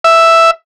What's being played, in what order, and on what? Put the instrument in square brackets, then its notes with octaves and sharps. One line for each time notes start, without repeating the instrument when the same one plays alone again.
[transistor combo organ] E5